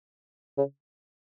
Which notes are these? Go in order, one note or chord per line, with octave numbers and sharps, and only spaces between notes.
C#3